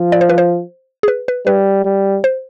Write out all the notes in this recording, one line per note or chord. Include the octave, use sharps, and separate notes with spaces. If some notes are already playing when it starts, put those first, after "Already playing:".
Already playing: F3
D5
C5
B4
C5
G#4
B4
B4
G3 B4
G3
C5